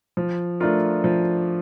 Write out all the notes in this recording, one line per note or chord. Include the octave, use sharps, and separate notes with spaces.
F3
A3 D4 F4 A#4
F3